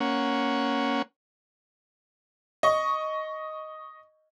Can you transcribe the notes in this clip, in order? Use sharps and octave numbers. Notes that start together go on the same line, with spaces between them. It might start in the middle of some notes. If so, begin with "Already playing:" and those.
A#3 C#4 F#5
D#5 C#6